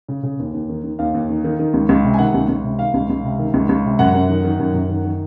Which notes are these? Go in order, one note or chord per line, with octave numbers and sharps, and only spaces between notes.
C#3
C#3
D#2
D#2
D#3
D#3
D#2 F5
D#2
D#3
D#3
D#3
C#2
C#2
C3
G#5
D#3 F#5
C#2
C#2
C3
D#3 F5
C#2
C#2
C3
D#3
C#2
C#2
C3
F#2 F#5
F#2
D#3
D#3
F#2
F#2
D#3
D#3